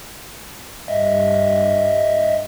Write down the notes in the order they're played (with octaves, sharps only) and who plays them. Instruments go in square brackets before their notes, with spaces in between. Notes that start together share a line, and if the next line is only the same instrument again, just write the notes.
[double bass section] G2 [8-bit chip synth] D#5 E5